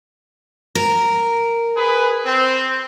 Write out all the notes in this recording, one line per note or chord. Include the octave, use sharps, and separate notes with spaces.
A#4
G#4 B4
C4